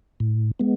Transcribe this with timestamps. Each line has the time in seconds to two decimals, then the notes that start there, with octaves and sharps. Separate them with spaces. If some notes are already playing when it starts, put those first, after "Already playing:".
0.20 A2
0.59 G#3 B3